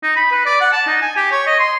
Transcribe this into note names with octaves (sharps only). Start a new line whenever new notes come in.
D#4
B5
B4
D5
F#5
A5
D#4
G#5
G4
C#5
D#5
C6